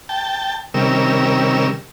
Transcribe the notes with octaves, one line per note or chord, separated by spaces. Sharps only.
G5 A5
C3 D#3 G3 C#4 A#4 E6